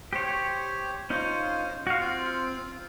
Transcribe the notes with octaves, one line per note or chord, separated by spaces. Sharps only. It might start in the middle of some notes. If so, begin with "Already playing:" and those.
G4 C5 C#5
C#4 D#4 F4 C5
F#4 F5
C4 F4